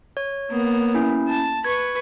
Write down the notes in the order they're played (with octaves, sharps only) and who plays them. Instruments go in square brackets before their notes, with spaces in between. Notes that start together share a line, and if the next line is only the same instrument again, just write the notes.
[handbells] C#5
[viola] A#3 B3
[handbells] C#4 E4
[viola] A5
[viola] B4 C#6 [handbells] G#6